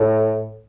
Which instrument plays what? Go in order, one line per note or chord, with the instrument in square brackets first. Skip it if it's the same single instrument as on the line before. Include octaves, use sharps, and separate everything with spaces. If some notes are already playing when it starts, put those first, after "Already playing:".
Already playing: [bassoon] A2